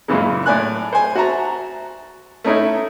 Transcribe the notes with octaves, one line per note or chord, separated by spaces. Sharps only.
F#2 A#2 C#3 E3 G#3
A2 D5 G#5 F#6
C5 G#5
F#4 E5 A5 A#5
A3 C#4 D#4 E4 E5